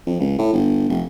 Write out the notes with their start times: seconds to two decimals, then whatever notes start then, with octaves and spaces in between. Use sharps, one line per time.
0.07 F2
0.20 C#2
0.39 A2
0.54 G1
0.89 F1